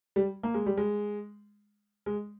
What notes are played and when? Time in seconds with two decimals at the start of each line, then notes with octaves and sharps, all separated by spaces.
0.16 G3
0.43 A#3
0.54 G#3
0.66 G3
0.78 G#3
2.06 G#3